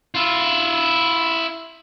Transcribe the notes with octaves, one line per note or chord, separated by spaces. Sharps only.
E4 F4